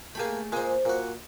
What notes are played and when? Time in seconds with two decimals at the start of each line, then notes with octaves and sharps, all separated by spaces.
0.15 A3 A#3 G4 G#4 B5
0.52 A#2 G#3 G#4 C5
0.85 A#2 F#4